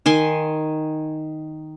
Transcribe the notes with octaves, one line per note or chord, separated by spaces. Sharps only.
D#3 G#5 C6